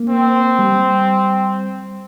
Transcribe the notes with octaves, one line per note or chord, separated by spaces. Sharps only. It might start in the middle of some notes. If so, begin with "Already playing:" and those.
Already playing: A#3
C4
G3